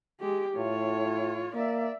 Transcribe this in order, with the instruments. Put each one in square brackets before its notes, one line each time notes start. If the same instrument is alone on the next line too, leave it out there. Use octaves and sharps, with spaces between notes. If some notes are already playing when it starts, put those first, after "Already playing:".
[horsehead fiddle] G#3 G4
[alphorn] A2 [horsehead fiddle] F4 C#5
[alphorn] A#3 [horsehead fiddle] D5 E5